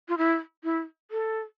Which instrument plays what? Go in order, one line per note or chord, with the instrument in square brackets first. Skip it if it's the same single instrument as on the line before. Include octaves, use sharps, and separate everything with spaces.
[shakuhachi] F4
E4
E4
A4